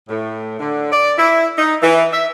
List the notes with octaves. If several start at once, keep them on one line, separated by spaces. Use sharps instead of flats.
A2
D3
D5
E4
D#4
E3
E5